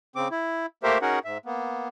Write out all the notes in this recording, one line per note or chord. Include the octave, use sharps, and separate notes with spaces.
C#3 C4 D6
E4
A3 A#3 G4 A#4 C5 E5
C#4 D#4 F#4 G#4 A#4 F#5
G#2 E5
A#3 B3